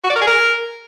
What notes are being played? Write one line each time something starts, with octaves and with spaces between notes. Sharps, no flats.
F#4
D5
A#4
G#4
A#4